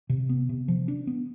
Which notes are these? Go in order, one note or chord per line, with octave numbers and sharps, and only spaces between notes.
C3
B3
C3
F3
D4
B3